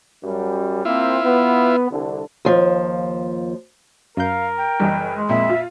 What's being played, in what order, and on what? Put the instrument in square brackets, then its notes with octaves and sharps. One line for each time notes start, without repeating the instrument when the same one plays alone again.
[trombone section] F#2 G3
[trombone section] A#3 C4 [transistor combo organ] E4 F4
[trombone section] B3
C2 D3
[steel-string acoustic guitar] D#2 F3
[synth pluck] F#2 G6 [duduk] A#4 [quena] F5
[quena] G5
[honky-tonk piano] F#1 E3 D#5 [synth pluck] G3
[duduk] G#3
[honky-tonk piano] F2 [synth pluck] A#2 [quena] E5
[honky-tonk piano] F4